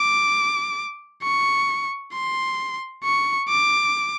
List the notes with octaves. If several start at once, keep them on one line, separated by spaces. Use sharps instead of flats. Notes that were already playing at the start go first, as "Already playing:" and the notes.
Already playing: D6
C#6
C6
C#6
D6